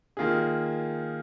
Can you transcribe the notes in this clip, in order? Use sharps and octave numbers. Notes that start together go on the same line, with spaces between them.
D#3 A#3 F4 G#4